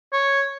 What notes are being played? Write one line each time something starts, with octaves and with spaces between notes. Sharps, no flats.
C#5